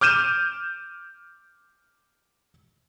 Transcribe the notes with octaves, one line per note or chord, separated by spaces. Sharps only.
D6 F6 G6 D#7 E7